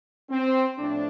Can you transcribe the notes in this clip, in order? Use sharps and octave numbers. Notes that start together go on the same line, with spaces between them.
C4
A2 F3 A3 D4